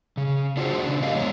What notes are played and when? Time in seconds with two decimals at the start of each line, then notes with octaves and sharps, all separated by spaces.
0.17 C#3
0.57 D4 F4 F#4 G#4 A4 C5
0.86 C#3 D4
1.02 A2 G4 A#4 D#5 F5
1.15 E2 G#3 B3 C#5 A#5